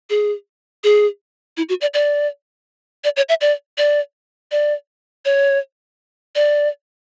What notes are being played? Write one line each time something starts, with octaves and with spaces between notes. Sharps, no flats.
G#4
G#4
E4
F#4
D5
D5
D5
C#5
E5
D5
D5
D5
C#5
D5